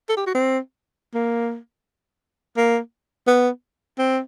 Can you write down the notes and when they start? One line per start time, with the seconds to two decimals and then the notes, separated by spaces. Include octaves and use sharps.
0.09 A4
0.17 G4
0.26 F#4
0.34 C4
1.14 A#3
2.57 A#3
3.27 B3
3.98 C4